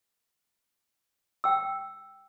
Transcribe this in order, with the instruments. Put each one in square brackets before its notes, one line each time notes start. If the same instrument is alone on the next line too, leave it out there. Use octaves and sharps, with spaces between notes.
[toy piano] G5 E6